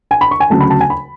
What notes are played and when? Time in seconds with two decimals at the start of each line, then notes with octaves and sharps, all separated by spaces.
0.11 G#5
0.21 B5
0.31 C#6
0.40 G#5
0.50 D2 C#3 F#3 A3 A5
0.60 B5
0.70 A5
0.80 G#5
0.90 B5